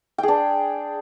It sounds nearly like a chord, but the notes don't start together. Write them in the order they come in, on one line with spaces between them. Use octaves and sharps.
G5 G#4 D4